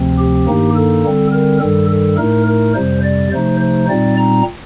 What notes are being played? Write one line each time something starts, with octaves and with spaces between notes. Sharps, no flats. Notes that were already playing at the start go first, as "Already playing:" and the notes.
Already playing: D2 C3 F3 C4
G4
G2 D#3 A#3 D#4
A4
D3 G3 C4
A#4
G2 D#3 G3 A4
A4
A2 A3 D#4 A#4
A#4
F2 C3 G3 C5
D5
C3 F3 A3 D#4 C5
C5
A#2 G3 C4 D#4 D5
A#5